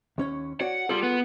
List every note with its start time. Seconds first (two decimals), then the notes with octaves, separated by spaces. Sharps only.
0.18 D#2 C#4 C#5
0.61 F#4 C#5 D5 F#5
0.89 G3 F4 G#4 A4
1.03 B3